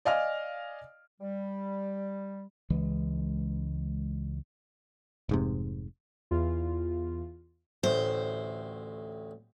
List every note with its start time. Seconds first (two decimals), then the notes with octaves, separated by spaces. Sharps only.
0.05 D5 D#5 F5 G#5 F6
1.21 G3
2.70 C#2 E3 G#3
5.29 F1 G#2 C3
6.31 E2 F4
7.83 A1 D2 A2 C5